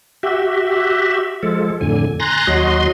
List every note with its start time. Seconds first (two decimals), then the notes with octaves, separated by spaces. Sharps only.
0.23 F#4 G4 E5
1.43 F3 G#3 A4
1.81 F2 A2 D3 G#5
2.20 G#5 A#5 C6 F#6 A6 A#6
2.47 D#2 F#3 F#4 D#5 C6